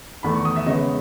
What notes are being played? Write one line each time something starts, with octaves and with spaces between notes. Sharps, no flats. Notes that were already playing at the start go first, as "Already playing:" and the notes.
E2 D#3 A3 B5
C#6
D#6
E5
C#3 G#3 B3 D#5